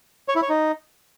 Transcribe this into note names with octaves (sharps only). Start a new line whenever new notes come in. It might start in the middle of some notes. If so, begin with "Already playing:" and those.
C#5
E4
C#5
D#4